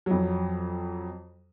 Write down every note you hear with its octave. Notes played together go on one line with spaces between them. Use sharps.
F2 F#3